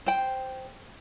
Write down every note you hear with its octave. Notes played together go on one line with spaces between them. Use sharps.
C5 G5